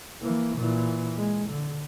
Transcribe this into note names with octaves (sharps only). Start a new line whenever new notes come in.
E3 A#3
A#2 E3
G#3
D3